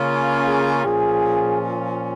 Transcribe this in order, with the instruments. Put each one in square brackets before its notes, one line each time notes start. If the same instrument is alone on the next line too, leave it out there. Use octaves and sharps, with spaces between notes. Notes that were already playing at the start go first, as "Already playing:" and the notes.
Already playing: [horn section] C#3 A#3 C#4 F4
[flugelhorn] G#4
[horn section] A#2 F3 C#4 F4 [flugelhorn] G#4